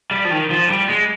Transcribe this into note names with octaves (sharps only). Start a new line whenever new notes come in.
G3
F3
D#3
F3
G3
G#3